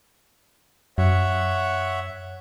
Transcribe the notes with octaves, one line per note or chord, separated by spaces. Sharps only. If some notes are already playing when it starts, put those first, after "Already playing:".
F#2 C#5 E5 F#5